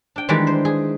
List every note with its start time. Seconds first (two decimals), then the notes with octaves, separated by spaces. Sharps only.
0.16 D4 G5
0.29 D#3 E3 G3 G#3 D4 G4
0.47 C5
0.65 G#4